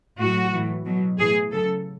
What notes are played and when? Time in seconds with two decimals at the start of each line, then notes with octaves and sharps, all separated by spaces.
0.19 A2 F#3 F#4
0.52 A2 E3
0.85 B2 F#3
1.18 A2 E3 G#4
1.51 C#3 F#3 A4